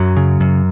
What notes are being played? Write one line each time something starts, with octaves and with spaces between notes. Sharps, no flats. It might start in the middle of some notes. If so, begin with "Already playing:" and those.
Already playing: F#2 F#3
C#3
F#2